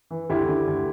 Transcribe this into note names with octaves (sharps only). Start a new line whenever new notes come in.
E3
D2 E4 G4
D3
D2